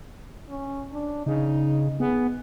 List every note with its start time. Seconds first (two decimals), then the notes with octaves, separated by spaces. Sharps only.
0.49 C#4
0.93 D4
1.26 C#3 D#4
2.00 B3 G#4